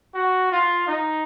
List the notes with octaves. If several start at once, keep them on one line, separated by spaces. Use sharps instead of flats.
F#4
F4
D#4